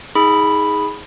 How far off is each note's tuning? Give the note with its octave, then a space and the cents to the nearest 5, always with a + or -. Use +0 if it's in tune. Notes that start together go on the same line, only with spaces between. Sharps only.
D#4 +35 G#4 +0 B5 +0